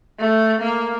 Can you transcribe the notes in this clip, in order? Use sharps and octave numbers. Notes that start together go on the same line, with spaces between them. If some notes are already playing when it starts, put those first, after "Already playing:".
A3
A#3